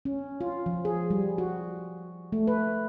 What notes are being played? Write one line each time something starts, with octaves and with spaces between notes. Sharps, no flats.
C#4
F4
F3
G#4
G3
F#4
A3
B4